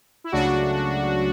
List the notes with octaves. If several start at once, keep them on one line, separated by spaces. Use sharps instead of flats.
E4
C#2 C#3 F#3 A3 D4 F#4